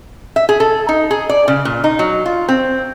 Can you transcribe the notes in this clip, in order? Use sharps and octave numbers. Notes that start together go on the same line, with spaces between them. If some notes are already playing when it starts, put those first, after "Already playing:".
E5
G#4
A4
D#4
G#4
D5
C#3
A#2
D#4
F#3
F4
C4